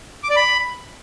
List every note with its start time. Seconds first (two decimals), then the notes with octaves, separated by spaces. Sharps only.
0.23 D6
0.30 D5
0.36 B5